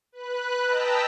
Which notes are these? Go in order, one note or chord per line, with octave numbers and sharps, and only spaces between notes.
B4 F#6
D#5 G5 A5 A#5 E6 B6